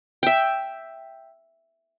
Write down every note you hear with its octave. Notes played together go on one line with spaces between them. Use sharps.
E5 G5